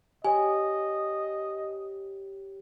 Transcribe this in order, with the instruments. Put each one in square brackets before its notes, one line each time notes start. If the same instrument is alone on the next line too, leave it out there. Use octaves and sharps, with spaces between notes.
[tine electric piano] G4 C#5 [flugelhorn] D#5 [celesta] G#5